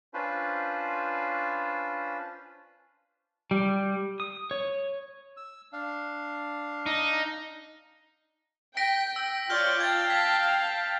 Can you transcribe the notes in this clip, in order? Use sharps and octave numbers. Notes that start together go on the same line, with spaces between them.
C#4 D4 F4 B4 C5
G3
D#6
C#5
E6
D4 F5
D#4
G5 A#6 B6 D7
E6
F4 C#5 D5 F6 G6 G7
F5 G5 A5 G#6 A6
A6 B6